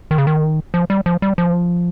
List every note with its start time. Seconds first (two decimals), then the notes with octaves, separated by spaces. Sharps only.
0.11 D#3
0.18 C#3
0.27 D#3
0.74 F3
0.90 G3
1.06 F3
1.22 G3
1.38 F3